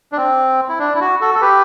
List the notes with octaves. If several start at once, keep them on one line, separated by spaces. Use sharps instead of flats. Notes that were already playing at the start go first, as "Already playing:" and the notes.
D4
C4
E4
D4
E4
F#4
F#4 A4
A4
G4 B4